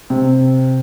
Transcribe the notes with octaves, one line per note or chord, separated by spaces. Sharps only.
C3